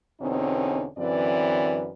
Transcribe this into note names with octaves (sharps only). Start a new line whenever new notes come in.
E2 B2 D3 C4 C#4 D#4
F#2 D3 E3 C4 B4 D5